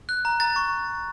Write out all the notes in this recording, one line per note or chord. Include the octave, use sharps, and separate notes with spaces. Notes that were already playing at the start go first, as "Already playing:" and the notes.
F#6
A#5
A#5 A6
C#6